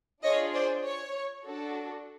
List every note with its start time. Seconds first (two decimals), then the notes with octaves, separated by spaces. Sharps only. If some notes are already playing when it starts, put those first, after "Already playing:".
0.23 D4 F4 G#4 C#5 D#5
0.54 C5 D5
0.85 C#5
1.45 D4 F#4 A4